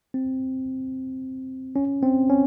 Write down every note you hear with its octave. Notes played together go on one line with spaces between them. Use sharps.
C4
C#4
C4
C#4